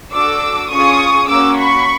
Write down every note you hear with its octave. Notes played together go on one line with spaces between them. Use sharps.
D4 F#4 A4 D6 E6
C#4 F4 G#4 C#6 D#6
A#3 C#4 F#4 D6 E6
B5 C#6